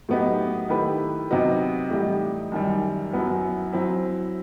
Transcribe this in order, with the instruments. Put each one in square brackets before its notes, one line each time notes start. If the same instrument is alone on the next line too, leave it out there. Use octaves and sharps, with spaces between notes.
[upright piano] A2 F#3 B3 D#4 G4
D#3 A3 E4 G4 B4
C3 F#3 B3 D#4 F#4
A2 E3 G3 D#4 G4
F#2 D#3 G3
F#2 F#3 B3 E4
F#3 C4 E4